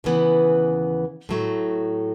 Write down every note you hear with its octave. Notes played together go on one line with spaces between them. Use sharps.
D#2 C#3 E3 B3
A2 F#3 A3